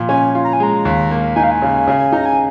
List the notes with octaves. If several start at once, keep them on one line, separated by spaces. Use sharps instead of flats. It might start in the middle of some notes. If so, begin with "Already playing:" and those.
Already playing: A#2 F3
C#4 G#5
F4
A#5
G#5
G#3 A#5
D#2
A#3
D#4 G#5
F5
G#5
C#3
C#3
D#4 A#5
G#5